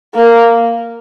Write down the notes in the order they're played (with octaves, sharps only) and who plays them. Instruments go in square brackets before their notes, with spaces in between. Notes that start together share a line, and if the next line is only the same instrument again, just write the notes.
[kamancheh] A#3